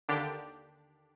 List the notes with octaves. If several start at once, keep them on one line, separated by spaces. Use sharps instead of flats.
D#2 D3 D4 G4